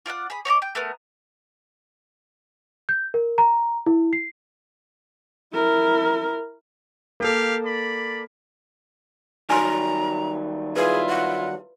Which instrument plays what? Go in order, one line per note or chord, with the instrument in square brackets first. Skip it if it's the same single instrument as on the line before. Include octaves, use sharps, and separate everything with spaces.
[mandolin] F4 D5 F5 F#5
G#4 B5
C#5 D#5 A#5 D6
G5
A3 B3 A#4
[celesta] G6
A#4
A#5
E4
C7
[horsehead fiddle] E4 A#4
[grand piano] A#3 A4 [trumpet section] G4 F5
[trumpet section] D5 B5
[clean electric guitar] D#3 F#3 G3 [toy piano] G#5 C6 [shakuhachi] A#5
[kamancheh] E4 F4 [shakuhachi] G#4 [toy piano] B4
[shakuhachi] F#5